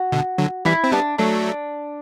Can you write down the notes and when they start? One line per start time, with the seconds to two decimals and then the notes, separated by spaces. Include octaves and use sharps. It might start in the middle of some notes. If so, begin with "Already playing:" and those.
Already playing: F#4
0.12 B2 D3
0.38 D3 F#3
0.65 E3 G3 E4
0.84 C4
0.92 G3 B3 D4
1.18 F#3 A3 D4